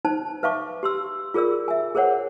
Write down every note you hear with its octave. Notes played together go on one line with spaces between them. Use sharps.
D#4 B4 C5 A5
B4 E5 F5 A5 C#6 D6
G4 C6 E6
F4 G#4 A#4 D5 E6
E5 G#5
G#4 A#4 C5 C#5 F#5